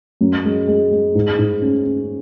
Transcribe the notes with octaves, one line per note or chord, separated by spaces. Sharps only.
F#2
G#3
G#3
G#3
G#2
G#2
C#4
C#4